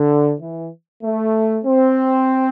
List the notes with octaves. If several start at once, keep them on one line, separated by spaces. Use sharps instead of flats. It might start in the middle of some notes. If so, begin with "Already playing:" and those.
Already playing: D3
E3
A3
C4